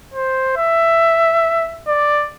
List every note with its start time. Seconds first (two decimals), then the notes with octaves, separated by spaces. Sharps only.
0.14 C5
0.57 E5
1.88 D5